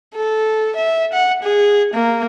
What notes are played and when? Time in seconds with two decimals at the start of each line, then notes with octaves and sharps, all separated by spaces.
0.15 A4
0.76 E5
1.13 F#5
1.43 G#4
1.94 A#3